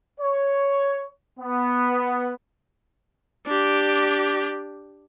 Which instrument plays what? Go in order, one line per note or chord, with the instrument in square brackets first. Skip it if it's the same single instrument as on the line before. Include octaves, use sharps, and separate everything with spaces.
[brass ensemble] C#5
B3
[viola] D4 G4